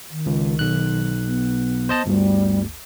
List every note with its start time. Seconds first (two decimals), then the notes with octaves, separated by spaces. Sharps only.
0.10 D#3
0.26 C#2
0.59 B1 F#6
1.25 B3
1.89 C5 D#5 A5
2.06 G1 D2 G3